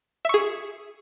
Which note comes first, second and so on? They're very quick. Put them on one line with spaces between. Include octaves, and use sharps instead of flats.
E5 C#6 G#4